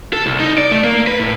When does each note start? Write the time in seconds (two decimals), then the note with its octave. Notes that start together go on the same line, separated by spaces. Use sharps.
0.13 A4
0.26 C2
0.40 D#4
0.58 D5
0.72 A3
0.84 A#3
1.07 B4
1.20 A2